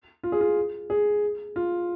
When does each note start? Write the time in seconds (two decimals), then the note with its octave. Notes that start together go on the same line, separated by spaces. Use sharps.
0.23 F4
0.32 G#4
0.41 F4
0.90 G#4
1.56 F4